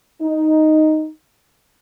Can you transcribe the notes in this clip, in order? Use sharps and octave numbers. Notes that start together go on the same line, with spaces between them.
D#4